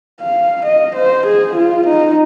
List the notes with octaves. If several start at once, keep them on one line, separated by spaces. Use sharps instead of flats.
F5
D#5
C5
G#4
F4
D#4